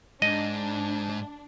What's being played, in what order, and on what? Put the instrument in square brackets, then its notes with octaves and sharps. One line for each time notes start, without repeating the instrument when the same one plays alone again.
[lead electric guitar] G#2 [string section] D4 [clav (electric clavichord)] D#5